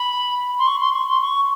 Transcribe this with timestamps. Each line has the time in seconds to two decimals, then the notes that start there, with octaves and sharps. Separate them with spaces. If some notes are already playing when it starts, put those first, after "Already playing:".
Already playing: B5
0.59 C6
0.67 C#6
0.80 C6
0.94 C#6
1.08 C6
1.22 C#6